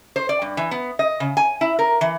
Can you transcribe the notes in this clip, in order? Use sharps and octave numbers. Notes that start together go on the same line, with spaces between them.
C5
D5
G2
E3
B3
D#5
C#3
G#5
E4
A#4
E3